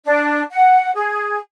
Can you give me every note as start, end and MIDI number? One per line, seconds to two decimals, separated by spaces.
0.05 0.41 62
0.51 0.90 78
0.95 1.38 68